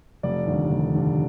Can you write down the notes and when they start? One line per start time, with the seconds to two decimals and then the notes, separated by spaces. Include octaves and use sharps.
0.23 F1 D5
0.46 D#2 D3 G3
0.71 F1
0.95 D#2 D3 G3